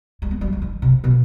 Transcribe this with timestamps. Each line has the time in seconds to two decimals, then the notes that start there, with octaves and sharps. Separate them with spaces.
0.22 G#3
0.31 B3
0.41 G3
0.53 F3
0.62 D#3
0.82 C3
1.04 B2